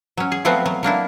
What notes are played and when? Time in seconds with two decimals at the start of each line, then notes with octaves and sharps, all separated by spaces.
0.17 F#3 C#4
0.32 G#4
0.45 F3 F#3 A3 B3 C4 F#4
0.66 F#3
0.83 F#3 A#3 D4 E4